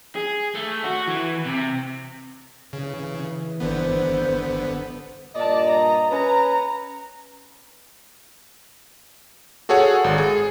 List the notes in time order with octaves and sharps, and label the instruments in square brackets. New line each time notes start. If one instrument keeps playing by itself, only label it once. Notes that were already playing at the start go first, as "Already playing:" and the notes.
[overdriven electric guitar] G#4
A3
F#4
E3
C3
[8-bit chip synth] C#3 [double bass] E3
[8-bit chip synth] G1 D3 B3 [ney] C5
[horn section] G2 A#2 D#5 [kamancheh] D5 A5
[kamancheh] A#5
[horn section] C#4 B4 [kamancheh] A#5
[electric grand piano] F#4 G#4 A4 C#5 F#5
G#1
G#4